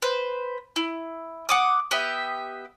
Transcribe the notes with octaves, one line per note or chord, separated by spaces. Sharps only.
B4 C5
E4
F#5 D6 D#6
B3 G4 D#5 E5